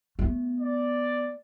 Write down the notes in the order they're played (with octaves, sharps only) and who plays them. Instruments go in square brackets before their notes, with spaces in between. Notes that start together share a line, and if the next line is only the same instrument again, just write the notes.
[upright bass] A3 B3
[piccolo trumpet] D5